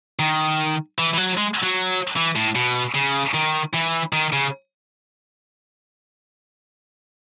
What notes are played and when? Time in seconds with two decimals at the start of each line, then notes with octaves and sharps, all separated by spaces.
0.19 D#3
0.99 E3
1.14 E3
1.18 F#3
1.38 G#3
1.63 F#3
2.17 E3
2.36 A2
2.55 B2
2.95 C#3
3.35 D#3
3.74 E3
4.13 D#3
4.33 C#3